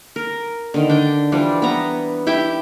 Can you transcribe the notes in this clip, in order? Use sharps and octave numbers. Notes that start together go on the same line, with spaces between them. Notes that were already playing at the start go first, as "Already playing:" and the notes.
A#4
D3 D#3
D4 G5
E3 F3 G3 D4
B3 A#5
E4 G4 E5 G5